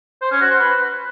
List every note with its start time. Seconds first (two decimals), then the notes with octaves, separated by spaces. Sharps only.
0.22 C5
0.31 C#4
0.41 F#4
0.50 C5
0.60 B4